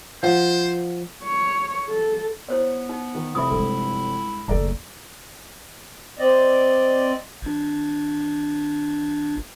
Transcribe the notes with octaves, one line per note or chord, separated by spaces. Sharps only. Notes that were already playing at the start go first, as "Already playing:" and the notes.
F3 C5 F5 F#5
C#5
A4
B3 E4 C5 C#5
D#4
D#3
F1 C4 E4 E5 B5 D#6
G2 G#3 A4
F#1 D#2 A3 D5 A#5
C4 D5 D#5
G#1 D4